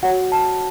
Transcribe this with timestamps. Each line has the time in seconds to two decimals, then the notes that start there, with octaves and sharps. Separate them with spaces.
0.03 F#4 C#5 F#5
0.32 A5